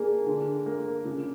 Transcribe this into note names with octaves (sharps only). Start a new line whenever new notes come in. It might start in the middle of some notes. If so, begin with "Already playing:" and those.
Already playing: A#3 D4 G#4
D3
A#3
C#3